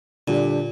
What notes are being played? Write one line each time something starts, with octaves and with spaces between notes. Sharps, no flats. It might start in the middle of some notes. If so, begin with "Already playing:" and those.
A#2 D3 G3 D4 G4